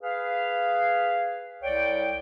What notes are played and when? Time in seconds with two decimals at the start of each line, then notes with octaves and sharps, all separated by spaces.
0.01 G#4 B4 F5
1.62 C2 C#5 D5 G5